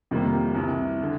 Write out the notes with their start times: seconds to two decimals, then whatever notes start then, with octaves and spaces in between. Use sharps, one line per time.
0.11 F2 C3 D#3 G3 A#3
0.55 C2 C3 E3
1.03 D3